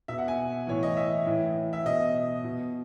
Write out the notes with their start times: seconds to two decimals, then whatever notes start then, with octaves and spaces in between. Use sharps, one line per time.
0.08 B2 E5
0.18 F#5
0.28 G#5
0.67 A2 E3 C#5
0.83 D#5
0.97 E5
1.26 A2 E3
1.73 E5
1.86 B2 D#5
2.44 B2